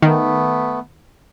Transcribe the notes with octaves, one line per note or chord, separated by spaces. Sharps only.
D#3 A3 B3